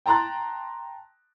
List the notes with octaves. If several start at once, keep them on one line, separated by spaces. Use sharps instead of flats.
G5 A5 A#5 C6 F#6 A6